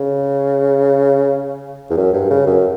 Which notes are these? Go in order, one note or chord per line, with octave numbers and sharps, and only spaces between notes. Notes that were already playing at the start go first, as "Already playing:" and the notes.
Already playing: C#3
E2
F#2
G2
C#3
F#2